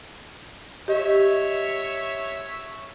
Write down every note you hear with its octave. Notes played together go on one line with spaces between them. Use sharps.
G4 C#5 D#5 E5